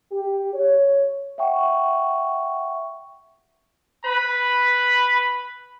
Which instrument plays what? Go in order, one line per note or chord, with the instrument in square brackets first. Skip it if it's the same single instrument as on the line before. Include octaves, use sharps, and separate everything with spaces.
[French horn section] G4
C#5
[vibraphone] E5 F#5 G5 C#6
[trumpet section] B4 B5